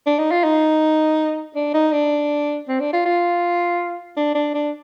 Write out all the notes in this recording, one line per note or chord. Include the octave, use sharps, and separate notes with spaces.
D4
D#4
F4
D#4
D4
D#4
D4
C4
D4
F4
F4
D4
D4
D4